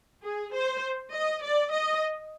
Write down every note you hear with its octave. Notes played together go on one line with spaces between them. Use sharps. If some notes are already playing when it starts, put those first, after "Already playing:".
G#4
C5
D#5
D5
D#5